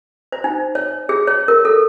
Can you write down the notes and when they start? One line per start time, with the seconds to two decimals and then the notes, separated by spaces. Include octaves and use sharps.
0.32 C5
0.44 D#4
0.75 C#5
1.09 G#4
1.27 C#5
1.48 A#4
1.65 A4